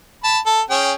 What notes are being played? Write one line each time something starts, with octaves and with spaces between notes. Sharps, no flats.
A5 B5
A4
C#4 G#4 G5